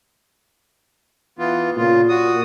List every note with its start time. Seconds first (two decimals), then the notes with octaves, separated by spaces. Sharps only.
1.39 E3 B3 F4
1.77 A#2 C#3 F4
2.09 F#4 D#6